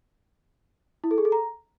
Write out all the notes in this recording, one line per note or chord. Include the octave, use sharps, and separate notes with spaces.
E4
A4
G#4
A4
A#5